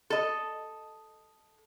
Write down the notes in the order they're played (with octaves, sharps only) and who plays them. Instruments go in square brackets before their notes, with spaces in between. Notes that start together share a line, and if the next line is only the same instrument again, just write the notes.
[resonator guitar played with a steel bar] A4 D#5